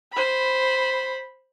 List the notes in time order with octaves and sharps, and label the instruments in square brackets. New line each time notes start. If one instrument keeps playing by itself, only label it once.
[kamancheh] C5 B5